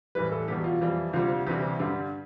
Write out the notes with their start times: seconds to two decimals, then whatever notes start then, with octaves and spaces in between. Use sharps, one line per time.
0.15 A2 E3 G3 B4
0.32 A4
0.48 E2 B2 G3 G4
0.64 F4
0.81 F2 E3 G3
1.13 D2 C3 G3 F4
1.46 D2 C3 E3 G3 G4
1.79 G2 D3 G3